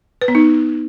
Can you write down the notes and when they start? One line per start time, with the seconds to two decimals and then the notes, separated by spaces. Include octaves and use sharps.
0.21 B4
0.28 B3
0.35 D#4